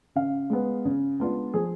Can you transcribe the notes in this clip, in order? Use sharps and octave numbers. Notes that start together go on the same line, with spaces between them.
C#3 F5
G#3 B3
C#3
G#3 B3 D4 F4
F3 G#4